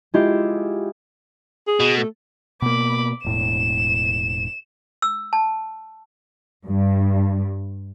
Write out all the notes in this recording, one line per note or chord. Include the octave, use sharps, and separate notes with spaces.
G#3 E4 F4 G4
G#4
B2
A3
B2 A#3 B5 D6
E1 A2 E7
E6
A5
G2